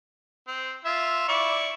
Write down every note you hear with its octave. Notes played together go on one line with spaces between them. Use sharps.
C4
F4 E5
E4 D5 C#6